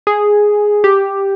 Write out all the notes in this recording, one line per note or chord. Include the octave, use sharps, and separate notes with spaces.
G#4
G4